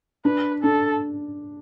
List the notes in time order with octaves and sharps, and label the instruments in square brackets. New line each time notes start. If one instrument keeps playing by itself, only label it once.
[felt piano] D4 [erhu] B4
[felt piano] D4 [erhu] A4